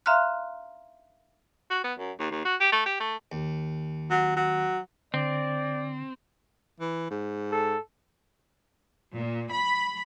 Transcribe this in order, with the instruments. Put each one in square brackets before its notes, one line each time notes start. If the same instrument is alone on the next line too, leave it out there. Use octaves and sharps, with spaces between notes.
[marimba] E5 F5 A#5 C6 F6 F#6
[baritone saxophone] F#4
B3
F#2
D#2
D#2
F#4
G4
A3
G4
A3
[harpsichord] D#2
[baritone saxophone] F#3
F#3
[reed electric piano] D3 [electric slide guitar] C4 [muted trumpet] D5
[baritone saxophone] E3
G#2
[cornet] A4
[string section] A#2
B5